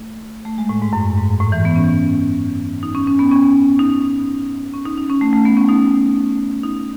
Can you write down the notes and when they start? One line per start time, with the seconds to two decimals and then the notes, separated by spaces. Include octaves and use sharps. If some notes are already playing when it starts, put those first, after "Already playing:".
Already playing: A3
0.45 A3
0.58 G#3
0.69 A2
0.82 G#2
0.93 F#2
1.17 G#2
1.40 A2
1.52 E3
1.65 B3
1.76 C#4
2.83 D#4
2.95 C#4
3.07 C#4
3.19 B3
3.31 C#4
3.79 D#4
4.74 C#4
4.86 D#4
4.98 D#4
5.10 C#4
5.21 A3
5.33 A3
5.45 B3
5.57 C#4
5.69 D#4
6.63 D#4